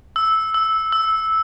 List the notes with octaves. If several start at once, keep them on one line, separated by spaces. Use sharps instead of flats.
E6
E6
E6